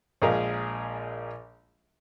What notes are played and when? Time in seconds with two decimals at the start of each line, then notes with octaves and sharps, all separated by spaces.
0.22 A#1 F3 G#3 G#4 A#4 F5